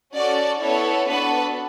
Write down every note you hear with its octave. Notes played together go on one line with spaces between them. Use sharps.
C#4 F#4 A4 D5
B3 E4 A4 C#5
B3 D4 F#4 A4 B4